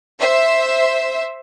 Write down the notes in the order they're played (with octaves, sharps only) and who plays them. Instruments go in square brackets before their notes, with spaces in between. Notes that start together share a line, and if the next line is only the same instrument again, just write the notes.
[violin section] C5 E5